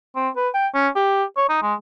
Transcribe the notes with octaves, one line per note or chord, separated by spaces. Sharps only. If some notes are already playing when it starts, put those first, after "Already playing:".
C4
B4
G5
C#4
G4
C#5
D#4
G#3